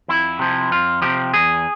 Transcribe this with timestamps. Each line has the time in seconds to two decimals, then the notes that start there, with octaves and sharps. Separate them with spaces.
0.08 F2 E4
0.39 C3 F3
0.71 F2 F4
1.02 C3 F3 G4
1.34 E2 G#4